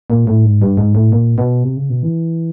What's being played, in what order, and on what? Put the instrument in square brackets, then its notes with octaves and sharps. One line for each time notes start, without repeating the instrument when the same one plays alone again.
[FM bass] A#2
A2
G#2
G2
G#2
A2
A#2
B2
C3
C#3
B2
E3